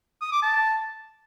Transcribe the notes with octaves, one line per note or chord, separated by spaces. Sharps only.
D#6
D6
A5